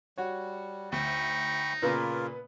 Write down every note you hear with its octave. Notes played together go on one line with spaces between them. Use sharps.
G3 F#4 C#5
D2 D#4 G5 B5 C#6
A#2 C#3 A#3 B3 F4 A#4 B4